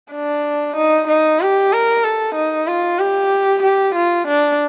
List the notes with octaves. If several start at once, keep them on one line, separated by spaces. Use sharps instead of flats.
D4
D#4
D#4
G4
A#4
A4
D#4
F4
G4
G4
F4
D4